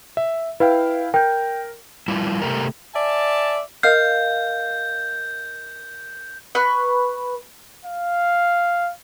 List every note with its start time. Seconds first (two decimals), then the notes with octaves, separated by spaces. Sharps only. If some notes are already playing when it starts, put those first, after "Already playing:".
0.17 E5
0.60 E4 B4 F5 G5
1.14 A#4 G5 G6
2.08 G3 E4 F4
2.42 C3 A3 G4 A#4
2.94 D5 E5 G#5 A5
3.83 A#4 D#5 F5 G6
6.55 B4 C#6 F#6
7.85 F5